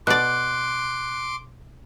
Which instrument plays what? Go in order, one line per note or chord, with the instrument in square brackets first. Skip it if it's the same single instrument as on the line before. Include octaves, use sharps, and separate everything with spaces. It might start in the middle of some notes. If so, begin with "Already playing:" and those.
[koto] B2 D5 [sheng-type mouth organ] C6 D6 [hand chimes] F#6